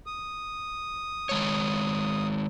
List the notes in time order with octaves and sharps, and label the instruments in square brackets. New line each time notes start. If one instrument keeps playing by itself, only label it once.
[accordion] D#6
[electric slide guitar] D#3 G#3 C#5